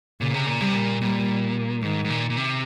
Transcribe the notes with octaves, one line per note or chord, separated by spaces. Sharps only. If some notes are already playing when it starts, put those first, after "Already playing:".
A#2 C#3
C3
A#2
C3 G3
A#2
A#2 G3
G#2 D#3
G#2
A#2
A#2
C3